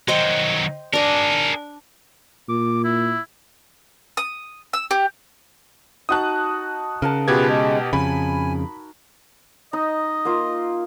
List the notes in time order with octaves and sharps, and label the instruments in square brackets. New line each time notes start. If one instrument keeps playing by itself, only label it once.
[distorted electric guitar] D#3 F#3 [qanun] C5 D#5 G5
[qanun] D4 D5 [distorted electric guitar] G#4 A#4
[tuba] A#2 [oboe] D6
[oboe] E4
[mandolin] D#6
E6
G4
[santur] D#4 F#4 A5 [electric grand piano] D#6 F#6
[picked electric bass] C#3 [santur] A#4 F#5 A5
[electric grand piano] B2 G4 G#6 [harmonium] F4 G#4 B4
[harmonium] G#3
[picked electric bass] F2 C#3 [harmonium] G#5 [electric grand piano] B5
[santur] D#4 [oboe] D#5
[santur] A#3 F4